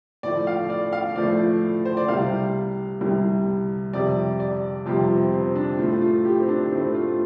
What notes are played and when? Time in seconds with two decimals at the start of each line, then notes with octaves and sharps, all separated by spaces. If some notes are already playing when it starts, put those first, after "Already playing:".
0.23 A2 F3 A3 D5
0.47 F5
0.70 D5
0.93 F5
1.16 A2 F3 A3 D5
1.85 C5
1.97 D5
2.08 C2 C3 G3 F5
3.01 C2 C3 G3
3.93 F2 C3 G3 D5
4.40 D5
4.86 F2 C3 G3 F4
5.10 C4
5.33 C4
5.55 D4
5.78 A2 A3 F4
6.02 F4
6.25 G4
6.40 C4
6.48 D4
6.71 A2 A3 C4
6.94 F4